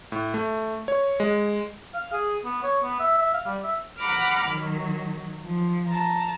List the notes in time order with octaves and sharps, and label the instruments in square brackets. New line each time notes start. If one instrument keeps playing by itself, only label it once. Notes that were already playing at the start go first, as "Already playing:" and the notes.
[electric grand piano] A2
A3
C#5
G#3
[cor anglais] F5
G#4
B3
C#5
B3
E5
E5
F5
G3
E5
[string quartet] F#5 A#5 B5 D6 F6
D#3 F#3
F3
A5 A#5